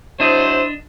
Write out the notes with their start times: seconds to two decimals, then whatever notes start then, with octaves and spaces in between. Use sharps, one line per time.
0.20 F#3 D4 E4 C5 D#5